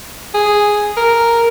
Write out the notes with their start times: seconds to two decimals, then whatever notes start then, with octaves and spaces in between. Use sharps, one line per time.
0.34 G#4
0.97 A#4